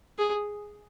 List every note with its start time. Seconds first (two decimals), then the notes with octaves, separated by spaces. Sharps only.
0.18 G#4